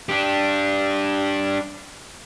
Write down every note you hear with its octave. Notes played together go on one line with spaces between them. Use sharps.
D4 G4